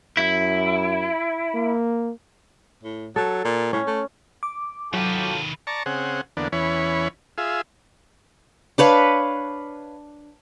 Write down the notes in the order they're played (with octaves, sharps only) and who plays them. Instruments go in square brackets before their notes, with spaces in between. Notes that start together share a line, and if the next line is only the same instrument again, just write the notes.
[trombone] F#2 [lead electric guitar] E4
[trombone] A#3
[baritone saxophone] A2
[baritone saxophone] F#3 [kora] A4
[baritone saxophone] A#2
[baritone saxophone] A2 [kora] C#4
[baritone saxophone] A3
[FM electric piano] D6
[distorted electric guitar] D#3 B4 [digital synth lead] F#3 [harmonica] F4 A4 G5
[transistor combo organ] D5 A5 A#5 C#6
C#3 C4 G#4 F#5
E2 D3 A#3 B3 D4
E2 E3 C#4 C#5 B5
F4 G#4 E5
[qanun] D4 B4 C#5 F5